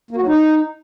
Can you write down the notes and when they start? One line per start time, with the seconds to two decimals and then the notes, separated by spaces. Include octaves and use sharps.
0.11 A#3
0.16 F#4
0.22 F#3
0.27 D#4